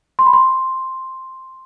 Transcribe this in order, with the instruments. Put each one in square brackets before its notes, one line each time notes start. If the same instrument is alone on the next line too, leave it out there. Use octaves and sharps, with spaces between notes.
[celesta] C6
B5
C6